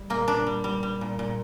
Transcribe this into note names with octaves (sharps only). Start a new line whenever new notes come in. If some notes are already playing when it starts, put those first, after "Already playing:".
Already playing: G3
A#2 A#3
A#2 D4
G3
G3
G3
A#2
A#2